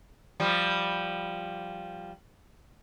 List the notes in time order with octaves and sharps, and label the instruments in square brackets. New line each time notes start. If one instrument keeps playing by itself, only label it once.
[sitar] F3 G3